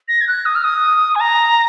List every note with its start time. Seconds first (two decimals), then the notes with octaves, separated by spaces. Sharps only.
0.08 A#6
0.21 G#6
0.27 F#6
0.45 D#6
0.55 F6
0.64 D#6
1.15 G#5
1.20 A#5